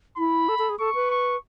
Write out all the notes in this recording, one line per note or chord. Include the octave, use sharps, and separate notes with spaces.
E4 B5
A4
A4
G#4
A4 C#6
B4
C#6